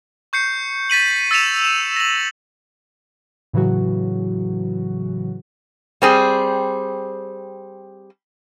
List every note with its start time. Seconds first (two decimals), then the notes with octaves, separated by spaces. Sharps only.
0.33 C#6 G6 C7 C#7
0.90 A6 B6 D#7 F#7
1.31 E6 A6 B6 C#7 E7 F7
1.65 E7
1.96 A#6 F#7
3.53 A2 C#3 E3 F#3 F#4
6.02 G3 C4 G#4